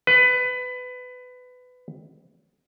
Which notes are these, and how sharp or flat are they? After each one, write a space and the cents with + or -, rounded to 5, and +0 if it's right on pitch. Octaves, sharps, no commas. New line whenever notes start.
B4 +20